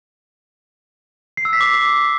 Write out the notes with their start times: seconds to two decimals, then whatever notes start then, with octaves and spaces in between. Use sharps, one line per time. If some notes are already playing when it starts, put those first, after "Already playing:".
1.37 C7
1.45 E6
1.53 B6
1.61 D6